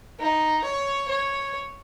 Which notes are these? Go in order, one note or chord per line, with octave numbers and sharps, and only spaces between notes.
D#4
C#5
C#5